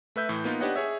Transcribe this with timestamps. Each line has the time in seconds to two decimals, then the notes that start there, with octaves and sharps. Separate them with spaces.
0.16 A3 B4 E5 G6
0.29 A2 E3
0.44 A#3 B3 D#4 F4
0.61 D4 G4 B4 C#5 D#5 F#5
0.76 G#4 C#5 E5